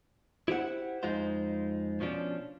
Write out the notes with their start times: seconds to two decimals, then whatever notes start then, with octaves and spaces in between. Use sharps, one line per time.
0.48 E4 G4 C5 F#5
1.03 F2 G#3 D#4 F4 C5
2.00 B2 F3 C#4 D4